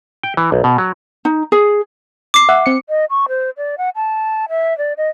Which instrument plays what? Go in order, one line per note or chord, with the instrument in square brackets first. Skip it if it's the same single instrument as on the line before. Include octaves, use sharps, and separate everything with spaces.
[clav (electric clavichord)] G5
E3
B1
B2
F#3
[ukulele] D#4
G#4
[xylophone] D6 C7
[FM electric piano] E5 F#5
C4 C#7
[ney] D#5
C#6
C5
D5
F#5
A5
E5
D5
D#5